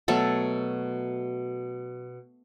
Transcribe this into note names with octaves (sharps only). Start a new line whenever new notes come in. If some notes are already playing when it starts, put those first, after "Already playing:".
B2 F#3 A3 A4